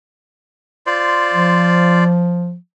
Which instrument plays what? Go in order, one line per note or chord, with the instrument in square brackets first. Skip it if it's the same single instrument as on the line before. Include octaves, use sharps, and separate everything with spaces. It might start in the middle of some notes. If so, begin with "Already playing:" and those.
[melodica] F4 C5 D5
[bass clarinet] F3